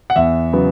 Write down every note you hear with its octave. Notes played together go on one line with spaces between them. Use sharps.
F#5
E2 E5
C#3 F#3 B3